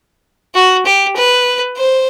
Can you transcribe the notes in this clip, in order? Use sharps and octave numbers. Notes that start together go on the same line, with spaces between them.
F#4
G4
B4
C5